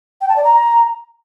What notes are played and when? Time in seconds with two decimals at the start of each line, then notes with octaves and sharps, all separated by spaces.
0.21 G5
0.29 A5
0.36 D5
0.44 A#5